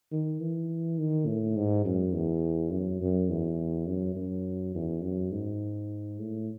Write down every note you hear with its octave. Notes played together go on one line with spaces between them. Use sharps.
D#3
E3
D#3
A2
G#2
F#2
E2
F#2
F#2
E2
F#2
F#2
E2
F#2
G#2
A2